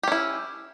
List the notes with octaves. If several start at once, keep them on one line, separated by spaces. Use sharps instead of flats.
C#4 E4 G4